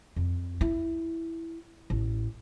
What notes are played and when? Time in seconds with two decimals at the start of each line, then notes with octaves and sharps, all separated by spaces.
0.16 F2
0.61 E4
1.90 A1